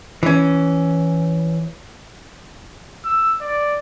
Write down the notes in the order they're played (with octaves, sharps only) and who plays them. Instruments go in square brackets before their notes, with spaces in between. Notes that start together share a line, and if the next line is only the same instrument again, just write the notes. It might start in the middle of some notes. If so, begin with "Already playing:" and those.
[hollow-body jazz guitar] E3 C#4
[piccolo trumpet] E6
D5